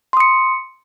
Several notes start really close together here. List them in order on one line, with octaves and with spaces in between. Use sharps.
C6 D#6 C#7